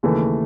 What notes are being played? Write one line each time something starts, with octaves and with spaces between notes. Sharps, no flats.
D#2 C#3 E3 A3